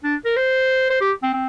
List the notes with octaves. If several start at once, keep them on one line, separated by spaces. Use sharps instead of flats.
D4
A#4
C5
C5
G4
C4
C4